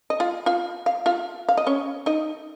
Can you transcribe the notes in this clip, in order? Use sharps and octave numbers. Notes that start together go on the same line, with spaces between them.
D#5
F4 F5
F4 F5
F5
F4 F5
F5
D#5
C#4 C#5
D#4 D#5